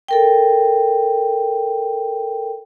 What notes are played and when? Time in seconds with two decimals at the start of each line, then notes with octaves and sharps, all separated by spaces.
0.08 A4 A#4 G5